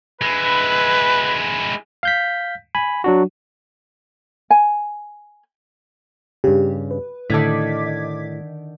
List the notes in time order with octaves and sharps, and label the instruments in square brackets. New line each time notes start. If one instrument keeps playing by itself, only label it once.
[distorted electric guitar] G#3 E4 [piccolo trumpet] B4
[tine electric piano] F5 G6 B6
G#5 B5
F#3 D4 F#4
[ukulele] G#5
[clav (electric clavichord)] G2 C#3 [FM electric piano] G4
[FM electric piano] B4
[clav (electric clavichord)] A2 A4 [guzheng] D3 D#3 [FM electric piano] D6 G#6 B6